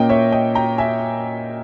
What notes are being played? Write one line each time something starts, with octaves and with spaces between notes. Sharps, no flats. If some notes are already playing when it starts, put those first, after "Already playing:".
Already playing: A#2 A#3 C#4 D#5 G5
C#5 E5
D#5 G5
G5 A#5
E5 G#5